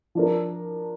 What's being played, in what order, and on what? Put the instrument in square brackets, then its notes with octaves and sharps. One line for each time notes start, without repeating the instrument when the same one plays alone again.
[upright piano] F3 D4 A#4